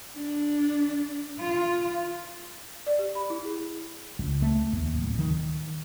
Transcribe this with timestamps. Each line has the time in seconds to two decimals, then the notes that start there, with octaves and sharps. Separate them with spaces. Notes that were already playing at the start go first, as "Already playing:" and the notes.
0.16 D4
1.40 F4
2.87 D5
2.99 G4
3.15 B5
3.30 E4
3.45 G#4
4.19 C#2
4.42 A3
4.73 D#2
4.97 D1
5.19 D#3